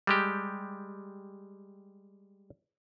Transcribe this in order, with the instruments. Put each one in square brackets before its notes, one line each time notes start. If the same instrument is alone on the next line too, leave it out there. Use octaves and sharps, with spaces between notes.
[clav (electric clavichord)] G3 G#3 G4